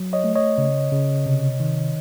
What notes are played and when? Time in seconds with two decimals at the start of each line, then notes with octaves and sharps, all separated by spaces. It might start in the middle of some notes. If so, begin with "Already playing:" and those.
Already playing: F#3
0.13 C#5 D#5
0.24 A3
0.35 C#5 D#5
0.58 C#3
0.92 C#3
1.26 C3
1.60 D#3